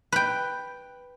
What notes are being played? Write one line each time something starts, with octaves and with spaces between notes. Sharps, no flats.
B4 G5